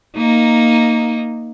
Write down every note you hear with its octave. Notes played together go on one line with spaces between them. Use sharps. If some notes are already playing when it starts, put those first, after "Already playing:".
A#3 D#4